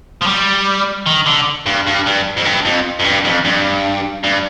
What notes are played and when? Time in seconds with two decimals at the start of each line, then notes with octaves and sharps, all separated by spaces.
0.22 F3
0.27 G3
1.06 D#3
1.26 D3
1.66 G2
1.87 G2
2.06 G2
2.37 F2
2.45 G2
2.65 F2
3.00 F2
3.05 G2
3.25 F2
3.45 G2
4.24 G2